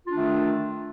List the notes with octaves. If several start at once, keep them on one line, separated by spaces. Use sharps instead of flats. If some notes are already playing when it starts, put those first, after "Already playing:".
D#3 A3 D4 F4